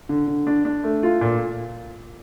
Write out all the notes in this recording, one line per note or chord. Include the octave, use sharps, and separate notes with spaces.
D3
D3
D4
D4
A3
F4
A#2